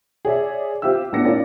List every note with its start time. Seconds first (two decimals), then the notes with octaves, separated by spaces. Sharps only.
0.25 G#4 C#5 D5 E5
0.82 C4 F4 G4 E5 E6
1.12 A#1 A2 B3 D4 A#6 C#7
1.25 C#4 D#4 F4 A#4 D5